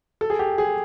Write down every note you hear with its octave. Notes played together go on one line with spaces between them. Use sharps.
A4
G#4
G4
G#4